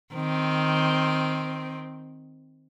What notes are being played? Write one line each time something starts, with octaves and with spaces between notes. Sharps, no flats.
D#3 C4